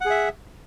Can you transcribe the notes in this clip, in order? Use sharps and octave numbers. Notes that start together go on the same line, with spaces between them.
G#4 E5 F#5